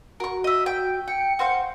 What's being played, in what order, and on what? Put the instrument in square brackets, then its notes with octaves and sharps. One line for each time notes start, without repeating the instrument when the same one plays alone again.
[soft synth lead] F#4 [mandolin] A#4 C#6
[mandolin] D#5 E5
G5
[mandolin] G5 [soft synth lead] C#7
[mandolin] F#4 C5 F5